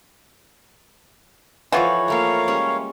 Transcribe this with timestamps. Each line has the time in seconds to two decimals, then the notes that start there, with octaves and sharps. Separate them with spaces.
1.72 E3 F3 F4 F#4 A4 C#5 F5
2.08 A3 A#3 A4 A#4 F5
2.48 G3 G#3 C#4